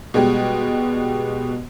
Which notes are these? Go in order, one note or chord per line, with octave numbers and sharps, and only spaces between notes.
B2 G3 G#3 G4